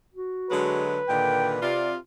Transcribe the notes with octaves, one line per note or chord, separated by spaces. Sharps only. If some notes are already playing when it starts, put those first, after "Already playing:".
F#4
D3 F#3 G#3 B4
A#2 D3 D#3 G5
C3 F4 D5